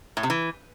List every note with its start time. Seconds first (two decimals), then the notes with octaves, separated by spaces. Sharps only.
0.17 A2
0.23 C3
0.30 E3